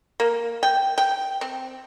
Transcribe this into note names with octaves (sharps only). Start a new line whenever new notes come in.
A#3
G5
G5
C4